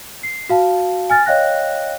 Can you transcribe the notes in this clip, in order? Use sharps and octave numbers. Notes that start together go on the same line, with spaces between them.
C7
F#4 F5 A5
G#5 F6 A6
C#5 D#5 F5 G5 F#6 A#6